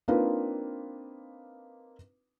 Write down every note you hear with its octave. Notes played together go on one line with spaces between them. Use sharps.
A#3 C4 D4 D#4 F4 B4